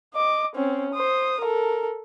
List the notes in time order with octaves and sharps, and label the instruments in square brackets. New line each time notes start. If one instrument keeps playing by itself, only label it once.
[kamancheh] D#5 D6
C4 C#4
C5 D#6
A4 A#4